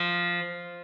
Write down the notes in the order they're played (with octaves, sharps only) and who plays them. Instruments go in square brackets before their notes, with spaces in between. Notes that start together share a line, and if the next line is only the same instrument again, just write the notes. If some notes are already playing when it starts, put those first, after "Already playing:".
Already playing: [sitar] F3